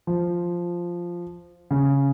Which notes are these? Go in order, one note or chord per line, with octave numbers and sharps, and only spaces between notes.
F3
C#3